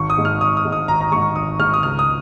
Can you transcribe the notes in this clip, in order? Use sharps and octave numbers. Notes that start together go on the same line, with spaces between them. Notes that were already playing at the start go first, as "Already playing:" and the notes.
Already playing: G#1 C#6
D#6
G#2 G#3
F6
G#1 D#6
D#6
G#2 G#3
D#6
G#1 A#5
A#5
G#2 G#3 C#6
G#1 D#6
G#2 G#3 F6
D#6
C#2 F6
D#6